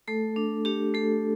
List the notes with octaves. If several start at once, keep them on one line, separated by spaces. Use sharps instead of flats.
A3 A4
D4
D4 G4
A3 A4